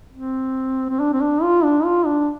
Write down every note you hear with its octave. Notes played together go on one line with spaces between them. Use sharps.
C4
C4
D4
C4
D4
F4
D4
F4
D4